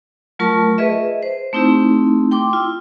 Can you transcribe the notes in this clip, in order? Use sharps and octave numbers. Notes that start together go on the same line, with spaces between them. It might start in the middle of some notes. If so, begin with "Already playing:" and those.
F#3 A3 F4 A#4 A5 C#6
G#4 B4 D#5 E5
C5
A3 C4 D#4 E4 G4
G5 C6 D6
E4 F4